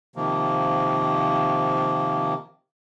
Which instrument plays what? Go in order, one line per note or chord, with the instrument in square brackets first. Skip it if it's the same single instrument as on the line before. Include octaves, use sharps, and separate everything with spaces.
[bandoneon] C3 D#3 F3 A#3